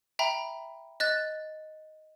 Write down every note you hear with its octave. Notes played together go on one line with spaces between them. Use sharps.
E5 G5 A#5 B5
D#5 F#6 A6